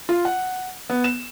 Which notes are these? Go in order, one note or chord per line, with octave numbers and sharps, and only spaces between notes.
F4
F#5
B3
E7